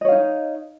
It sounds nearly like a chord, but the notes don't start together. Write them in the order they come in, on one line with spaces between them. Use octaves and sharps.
D#5 C#5 F5 D#4